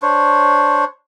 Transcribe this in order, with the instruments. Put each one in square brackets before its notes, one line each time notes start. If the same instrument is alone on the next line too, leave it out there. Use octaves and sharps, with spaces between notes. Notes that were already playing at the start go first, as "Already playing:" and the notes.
[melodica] D4 C5 C#5